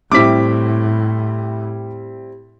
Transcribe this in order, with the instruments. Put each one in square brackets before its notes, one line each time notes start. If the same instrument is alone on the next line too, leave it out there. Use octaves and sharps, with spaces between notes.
[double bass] A2 [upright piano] G3 C4 E4 [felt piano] D6 B6